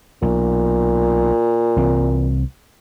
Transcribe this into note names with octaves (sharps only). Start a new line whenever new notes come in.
B1 A#2
C2 E3 C4